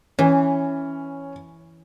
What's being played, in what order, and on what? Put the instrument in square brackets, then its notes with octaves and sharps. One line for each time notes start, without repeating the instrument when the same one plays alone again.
[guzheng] E3 [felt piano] C#4